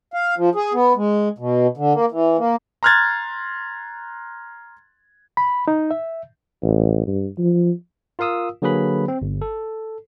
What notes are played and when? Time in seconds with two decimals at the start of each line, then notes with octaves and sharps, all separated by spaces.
0.14 F5
0.37 F3
0.55 G#4
0.74 B3
0.96 G#3
1.38 B2
1.77 D3
1.93 A#3
2.11 E3
2.38 A#3
2.83 A#5 C6 F6 F#6 G#6 A6
5.37 B5
5.68 D#4
5.91 E5
6.63 A1
7.07 G2
7.38 F3
8.19 F4 A#4 F5 D#6 E6
8.62 D3 F#3 A#3 G#4 B4 B5
9.08 C4
9.22 G1
9.42 A4